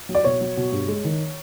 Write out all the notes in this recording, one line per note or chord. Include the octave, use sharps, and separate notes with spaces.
F#3
D5
B2 C#5
F#3
B2
G2
G#3
D#3